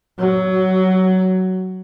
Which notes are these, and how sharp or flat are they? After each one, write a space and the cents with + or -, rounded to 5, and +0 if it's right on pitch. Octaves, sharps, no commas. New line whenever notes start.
F#3 +15